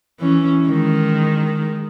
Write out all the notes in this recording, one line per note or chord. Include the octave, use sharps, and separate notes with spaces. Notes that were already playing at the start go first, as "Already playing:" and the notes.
E3 C#4
D#3 G#3